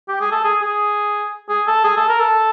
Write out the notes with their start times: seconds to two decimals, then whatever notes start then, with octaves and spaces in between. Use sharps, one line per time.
0.08 G4
0.20 G#4
0.31 A4
0.44 G#4
0.62 G#4
1.49 G#4
1.67 A4
1.84 G#4
1.97 A4
2.08 A#4
2.19 A4